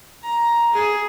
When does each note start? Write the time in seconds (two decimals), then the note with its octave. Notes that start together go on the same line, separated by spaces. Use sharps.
0.24 A#5
0.73 G#4